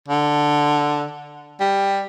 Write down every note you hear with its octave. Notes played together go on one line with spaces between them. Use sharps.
D3
G3